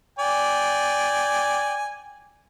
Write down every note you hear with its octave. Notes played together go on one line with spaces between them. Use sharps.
D5 G5 G#5